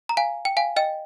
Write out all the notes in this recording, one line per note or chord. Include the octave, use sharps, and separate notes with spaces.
A#5
F5 G#5
G5
F5 G#5
D#5 G5